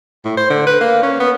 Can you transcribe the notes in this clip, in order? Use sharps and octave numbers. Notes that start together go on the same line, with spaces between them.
A2
C5
D3
B4
A#3
C#4
B3